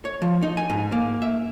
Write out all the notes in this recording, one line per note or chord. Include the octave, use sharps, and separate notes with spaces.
C#5
F3
D#4
G#5
G#2
A#3
E5